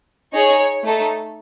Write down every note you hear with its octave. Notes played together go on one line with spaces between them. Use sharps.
D#4 G#4 C#5
A3 D#4 A4